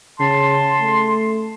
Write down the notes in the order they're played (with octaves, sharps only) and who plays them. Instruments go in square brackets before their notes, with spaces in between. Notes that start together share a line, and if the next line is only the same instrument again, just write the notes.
[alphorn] C#3 [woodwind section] A5 C6
[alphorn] A3